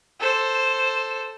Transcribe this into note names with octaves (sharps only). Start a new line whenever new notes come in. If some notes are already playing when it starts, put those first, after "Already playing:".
A4 C5